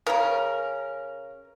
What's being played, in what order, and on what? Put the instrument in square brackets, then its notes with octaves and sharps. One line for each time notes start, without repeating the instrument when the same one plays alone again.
[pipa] C#3 C#4 [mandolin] A#4